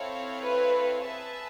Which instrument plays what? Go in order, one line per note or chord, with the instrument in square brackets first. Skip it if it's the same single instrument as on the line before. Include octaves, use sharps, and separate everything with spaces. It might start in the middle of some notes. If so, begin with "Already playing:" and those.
Already playing: [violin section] C4 E4 A4 C#5 F5
[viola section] B4
[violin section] G#4 B4 E5 A5